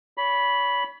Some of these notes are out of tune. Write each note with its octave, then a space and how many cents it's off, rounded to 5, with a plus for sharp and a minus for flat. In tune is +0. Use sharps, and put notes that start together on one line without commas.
C#5 +35 B5 -5